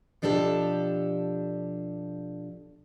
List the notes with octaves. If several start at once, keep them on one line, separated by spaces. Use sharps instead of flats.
B2 F3 D4 G4 A4